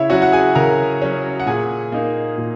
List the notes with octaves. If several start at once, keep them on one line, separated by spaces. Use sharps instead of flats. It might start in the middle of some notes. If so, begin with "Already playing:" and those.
Already playing: C#3 E4 C#5 E5
F#3 C#4 F#4 F#5
F#5
G#4 G#5
C#3 A#4 A#5
F#3 C#4
F#5
A#2 G#4 G#5
A#3 D#4
A#2